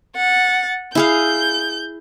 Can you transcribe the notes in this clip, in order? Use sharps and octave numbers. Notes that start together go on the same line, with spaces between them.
F#5 A6
E4 G#4 F5 G6